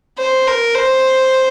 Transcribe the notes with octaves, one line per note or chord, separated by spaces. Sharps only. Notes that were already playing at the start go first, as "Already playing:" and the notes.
C5
A#4
C5